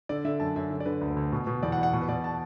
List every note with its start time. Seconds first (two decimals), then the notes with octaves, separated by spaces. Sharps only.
0.09 D3 D5
0.25 D3 E5
0.40 F#2 A5
0.56 F#2 E5
0.71 D3
0.80 D5
0.86 D3 B4
1.01 D2
1.16 D2
1.32 B2
1.47 B2
1.63 E2 D5
1.72 F#5
1.78 E2
1.83 F#5
1.93 B2
2.01 B4
2.08 B2 D5
2.24 A5